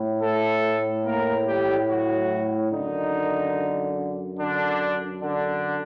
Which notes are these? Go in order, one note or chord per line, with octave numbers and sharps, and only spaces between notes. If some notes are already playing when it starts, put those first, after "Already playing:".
Already playing: A2
A3 A4
A#3 A#4
G3 G4
F#3 F#4
F#2 D3 D#3 D#4
D3 D4
D3 D4